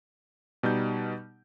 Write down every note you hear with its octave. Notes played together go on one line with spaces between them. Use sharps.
B2 G3 D#4 G6